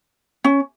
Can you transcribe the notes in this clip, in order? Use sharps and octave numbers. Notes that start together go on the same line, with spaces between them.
C#4